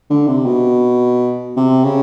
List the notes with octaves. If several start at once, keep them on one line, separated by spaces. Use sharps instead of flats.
D3
C3
B2
C3
C#3